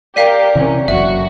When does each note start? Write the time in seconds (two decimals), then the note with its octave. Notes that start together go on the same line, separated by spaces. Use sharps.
0.16 G4 A#4 D5 F5 B6 D#7
0.55 C3 E3 C#4
0.88 F#1 F#2 F#4 E5